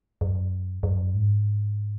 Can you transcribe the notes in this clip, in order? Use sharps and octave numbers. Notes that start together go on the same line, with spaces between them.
F#2
F#2
G#2